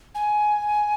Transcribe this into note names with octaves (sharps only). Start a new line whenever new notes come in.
G#5